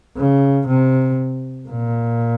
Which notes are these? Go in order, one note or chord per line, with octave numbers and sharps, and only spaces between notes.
C#3
C3
A#2